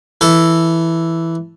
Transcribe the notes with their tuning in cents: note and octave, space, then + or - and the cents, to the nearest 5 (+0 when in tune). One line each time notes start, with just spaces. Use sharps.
E3 +0 A4 +0